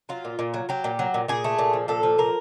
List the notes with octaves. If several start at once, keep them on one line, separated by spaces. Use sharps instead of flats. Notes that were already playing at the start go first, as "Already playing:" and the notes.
F#3 F4
A#2
A#2
F#3
F#3 G4
A#2
F#3
A#2
A#2 G#4
A3
A#2
F3
A#2 A4
F3
A#2 A#4